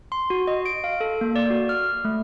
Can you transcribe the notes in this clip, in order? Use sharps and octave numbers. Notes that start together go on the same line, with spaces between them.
C6
F#4
D#5
D7
F5
A4
A#3
D5
F#4
F6
A3